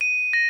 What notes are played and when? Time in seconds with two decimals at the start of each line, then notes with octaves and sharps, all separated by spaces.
0.01 D#7
0.33 A#6